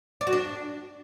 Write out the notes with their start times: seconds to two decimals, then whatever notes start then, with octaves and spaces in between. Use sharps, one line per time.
0.21 D5
0.27 F#4
0.33 D4